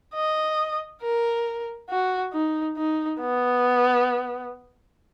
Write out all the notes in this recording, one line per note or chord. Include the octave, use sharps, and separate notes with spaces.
D#5
A#4
F#4
D#4
D#4
B3